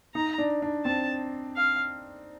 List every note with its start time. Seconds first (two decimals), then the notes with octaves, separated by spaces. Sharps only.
0.15 D#4 A#5
0.38 D4
0.62 D4
0.85 C4 A5
1.56 F5